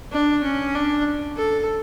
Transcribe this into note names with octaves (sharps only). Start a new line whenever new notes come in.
D4
C#4
D4
A4